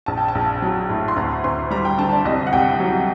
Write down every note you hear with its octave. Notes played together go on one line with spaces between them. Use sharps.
A#1 A5
G5
A5
A#1
F#3
A2
C6
D2 A#5
D2 C6
G3 A#5
G5
D3 A5
D5
C2 D#5
F#5
C2 G5
F#3